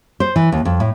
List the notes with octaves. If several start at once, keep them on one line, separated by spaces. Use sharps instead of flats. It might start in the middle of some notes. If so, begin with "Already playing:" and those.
C5
E3
D#2
F2
A2